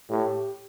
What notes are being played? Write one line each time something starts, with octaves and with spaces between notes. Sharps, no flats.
A2 G4